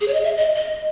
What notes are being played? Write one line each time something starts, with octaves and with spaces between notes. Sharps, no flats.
G#4
C#5
D#5
E5
D#5
D#5